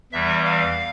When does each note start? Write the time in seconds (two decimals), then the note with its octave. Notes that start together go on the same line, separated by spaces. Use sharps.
0.12 E2 E3 G3 E5
0.44 F5